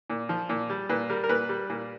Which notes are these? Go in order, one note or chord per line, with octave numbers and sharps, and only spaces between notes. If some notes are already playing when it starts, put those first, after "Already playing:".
A#2
F3
A#2
G3
A#2 B4
G3 A#4
A#4
A#2 B4
G3
A#2